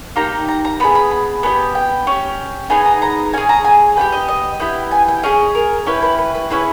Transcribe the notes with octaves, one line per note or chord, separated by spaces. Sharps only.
A#3 D#4 G4 A#5
A#5
A#5
B3 D#4 G#4 B5
B5
B5
B3 D#4 G4 G#5
G5
C#4 G4
B3 D#4 G#4 G#5
A#5
A#5
C#4 G#4 G#5
A#5
G#5
B3 E4 G4 G5
D#5
D#5
B3 E4 G4 G5
G#5
G5
C#4 G#4 D#5
A#4
C#4 E4 G4 B4
B4
B4
B4
C#4 E4 G#4 B4